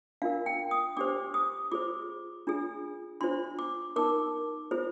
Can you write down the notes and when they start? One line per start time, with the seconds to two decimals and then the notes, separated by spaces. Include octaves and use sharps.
0.22 D4 F4 A#4 F5
0.46 G5
0.71 D#6
0.97 D4 G4 C5 D6
1.34 D#6
1.72 F4 G#4 C5 D6
2.47 D4 F4 G#4
3.21 D4 F4 C5 C6
3.59 D6
3.96 D#4 A#4 D6
4.71 F4 G#4 C5